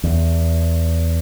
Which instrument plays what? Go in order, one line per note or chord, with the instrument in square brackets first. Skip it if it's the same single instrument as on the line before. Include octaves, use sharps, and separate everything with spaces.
[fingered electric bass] E2